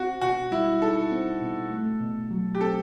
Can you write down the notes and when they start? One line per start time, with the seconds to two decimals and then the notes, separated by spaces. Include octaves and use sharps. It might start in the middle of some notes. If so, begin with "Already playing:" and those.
Already playing: C4 F#4
0.21 B2 F#4
0.51 G3 E4
0.81 D#4 A4
1.11 C4
1.41 B2
1.71 A3
2.01 B2
2.31 F#3
2.55 G4
2.61 C4 A4